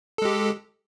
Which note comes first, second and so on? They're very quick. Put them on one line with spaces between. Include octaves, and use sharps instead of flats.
A4 G#3 G4